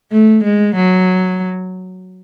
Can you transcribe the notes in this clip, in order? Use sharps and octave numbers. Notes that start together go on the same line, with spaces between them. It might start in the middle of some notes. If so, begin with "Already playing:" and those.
A3
G#3
F#3